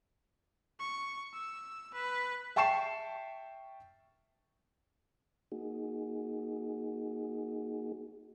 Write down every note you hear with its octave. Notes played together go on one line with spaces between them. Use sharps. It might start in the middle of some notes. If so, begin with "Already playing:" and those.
C#6
E6
B4
E5 G5 A5 C#6 C7 E7
A#3 D#4 F#4 G#4